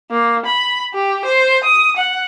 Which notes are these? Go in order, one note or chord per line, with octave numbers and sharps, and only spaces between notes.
A#3
B5
G4
C5
D#6
F#5